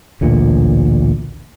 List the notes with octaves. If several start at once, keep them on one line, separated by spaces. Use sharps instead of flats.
A1 D2 A#2